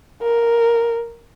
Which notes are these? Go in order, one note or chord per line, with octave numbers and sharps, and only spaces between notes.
A#4